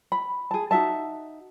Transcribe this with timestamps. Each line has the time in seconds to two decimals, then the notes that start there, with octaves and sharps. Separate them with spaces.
0.12 B5
0.51 G#4 A5
0.71 D#4 F#4 E5 A5